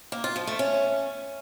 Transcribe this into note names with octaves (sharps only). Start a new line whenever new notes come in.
A#3
F4
F3
A3
C#4